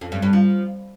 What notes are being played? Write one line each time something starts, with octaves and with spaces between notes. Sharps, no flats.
F2
G2
G2
F3